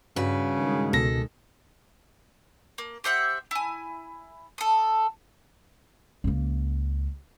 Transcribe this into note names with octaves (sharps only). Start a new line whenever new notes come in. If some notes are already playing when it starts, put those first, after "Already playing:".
G2 C#3 F#4 B4
D#3 G#3
C#2 B2 A4 A#6
A#3
G4 C5 E5 F#5
E4 G#5
A4 D#6
C#2 A#3